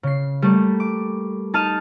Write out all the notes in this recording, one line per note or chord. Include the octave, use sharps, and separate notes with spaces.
C#3 C7
G3 A3 A#3
D6
D#4 A5 F6 D#7 E7